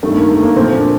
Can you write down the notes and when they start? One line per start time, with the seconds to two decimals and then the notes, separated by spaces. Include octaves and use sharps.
0.03 G2 D#3 A3
0.17 A#3
0.29 A3
0.43 A#3
0.56 A#2 F3 C4
0.74 D4